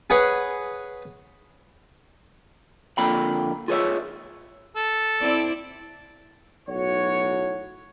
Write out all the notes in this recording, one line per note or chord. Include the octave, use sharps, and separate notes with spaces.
G#4 B4 C#5 F#5
F2 D3 A#3 F4 G5 B5
F4 G#4 B4 C#5 E5
A4
C4 E4 D5
B1 A2 F#4 C#5